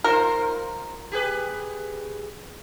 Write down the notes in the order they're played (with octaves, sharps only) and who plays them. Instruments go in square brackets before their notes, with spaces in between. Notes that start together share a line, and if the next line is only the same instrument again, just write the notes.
[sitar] D#4 F4 C5 [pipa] A#4
[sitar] G4 G#4 B4